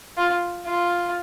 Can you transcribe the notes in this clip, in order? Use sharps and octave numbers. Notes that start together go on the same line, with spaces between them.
F4
F4